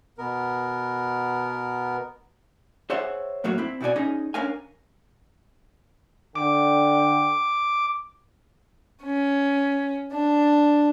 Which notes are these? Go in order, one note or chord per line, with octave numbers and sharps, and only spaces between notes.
B2 B3 A#4
G#4 C5 C#5 E5 F#5
A2 F#3 A3 A#3 F#4
C4 E4
B2 C4 F#4 D5 G#5
C#4 D#4 G#4 D#5
C#4 D4 A#4 F5 G#5
D3 G5 D6
C#4
D4